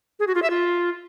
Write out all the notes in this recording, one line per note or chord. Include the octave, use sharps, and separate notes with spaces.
G#4
F#4
F4
E5
F4